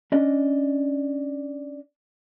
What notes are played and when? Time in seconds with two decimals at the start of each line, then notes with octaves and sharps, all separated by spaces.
0.12 C#4 D4 D5 D#5